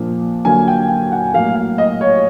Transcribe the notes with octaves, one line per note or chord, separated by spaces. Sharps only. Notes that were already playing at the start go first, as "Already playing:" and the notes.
Already playing: A#2 F3 A#3 D4
D3 F#3 A#3 G#5
G5
G5
F#5
A2 F#3 A#3 F5
F5
D#5
C#5